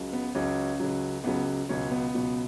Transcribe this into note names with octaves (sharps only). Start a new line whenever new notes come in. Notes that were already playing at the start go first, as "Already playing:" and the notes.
Already playing: C#2 C#3 F#3
B3
C#2 C#3 F#3 C#4
C#2 C#3 F#3
C#2 C#3 F#3 B3
C#2 B2 F#3 C#4
B3
C#2 B2 F#3